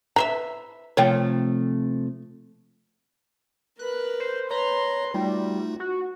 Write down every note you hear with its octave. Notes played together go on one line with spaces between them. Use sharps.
B4 C5 E5 A#5
C3 F3 A3 C#5 G5
A#4 B4 F#6
C5
B4 C#5 A#5 C6
G3 A3 D#4 F4 F#4
F#4